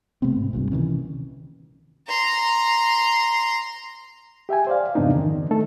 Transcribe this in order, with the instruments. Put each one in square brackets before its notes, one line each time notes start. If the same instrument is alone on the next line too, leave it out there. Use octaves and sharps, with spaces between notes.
[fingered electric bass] C3 A3 B3 C4
G#2
C2 G2 A#2
C3 D#3 E3 C#4
[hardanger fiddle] A#5 C6
[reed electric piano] G4 E5 G5 G#5
C5 D5 F5
F2 G#2 C#3 B3 D4 D#4
D#3
A3 D#4 A4